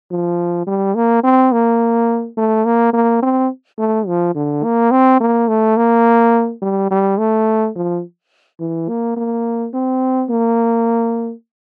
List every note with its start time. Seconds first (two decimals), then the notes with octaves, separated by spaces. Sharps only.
0.11 F3
0.67 G3
0.95 A#3
1.24 C4
1.52 A#3
2.37 A3
2.65 A#3
2.93 A#3
3.22 C4
3.79 A3
4.07 F3
4.35 D3
4.64 A#3
4.91 C4
5.20 A#3
5.48 A3
5.77 A#3
6.62 G3
6.91 G3
7.18 A3
7.76 F3
8.60 E3
8.89 A#3
9.17 A#3
9.74 C4
10.30 A#3